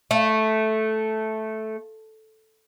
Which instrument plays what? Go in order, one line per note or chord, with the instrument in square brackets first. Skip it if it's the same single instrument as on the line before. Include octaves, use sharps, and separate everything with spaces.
[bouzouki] A3